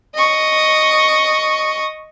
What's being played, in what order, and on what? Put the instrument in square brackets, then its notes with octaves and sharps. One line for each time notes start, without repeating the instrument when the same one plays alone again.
[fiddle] D#5 C#6